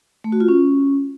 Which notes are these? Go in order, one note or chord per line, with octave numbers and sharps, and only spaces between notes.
A3
F#4
F4
C#4